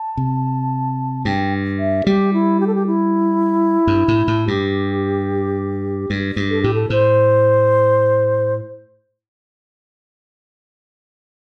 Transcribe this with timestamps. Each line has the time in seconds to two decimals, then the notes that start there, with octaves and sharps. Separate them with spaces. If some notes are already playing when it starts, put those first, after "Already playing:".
Already playing: A5
0.17 C3
1.25 G2 G5
1.79 E5
2.06 G3 G4
2.33 E4
2.60 G4
2.67 A4
2.75 G4
2.87 E4
3.87 G2
4.08 A2
4.28 A2
4.48 G2 G4
6.10 G2
6.36 G2
6.50 A4
6.62 A2 G4
6.74 A4
6.90 A2 C5